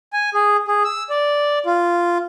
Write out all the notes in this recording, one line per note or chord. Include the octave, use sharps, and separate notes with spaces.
G#5
G#4
G#4
E6
D5
F4